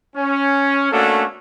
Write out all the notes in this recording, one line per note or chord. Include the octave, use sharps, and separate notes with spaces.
C#4
A3 A#3 C#4 D4 F#4 A4